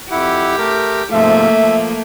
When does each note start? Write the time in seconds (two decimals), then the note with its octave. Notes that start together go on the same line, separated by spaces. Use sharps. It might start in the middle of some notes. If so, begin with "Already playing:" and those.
0.11 F2 E4 G4 F#5
0.58 A3 A#4
1.12 G#2 C3 F3 A3 A#3 E5
1.62 F3